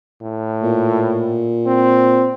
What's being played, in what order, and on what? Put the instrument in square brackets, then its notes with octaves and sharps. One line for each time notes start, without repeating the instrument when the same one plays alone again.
[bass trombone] A2
[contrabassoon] A#2
[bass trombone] C4